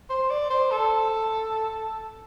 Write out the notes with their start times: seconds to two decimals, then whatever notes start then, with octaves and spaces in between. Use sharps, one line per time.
0.09 C5
0.30 D5
0.50 C5
0.71 A4